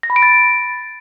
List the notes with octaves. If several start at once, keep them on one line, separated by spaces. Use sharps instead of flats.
A#6
B5
D7
A6